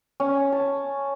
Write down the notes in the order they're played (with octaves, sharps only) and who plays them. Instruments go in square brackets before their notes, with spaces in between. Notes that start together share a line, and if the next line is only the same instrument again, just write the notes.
[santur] C#4
A5